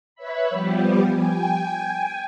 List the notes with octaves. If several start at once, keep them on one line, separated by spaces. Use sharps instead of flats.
B4 C#5 E5 B5
F3 G3 B3 G4
G5 G#5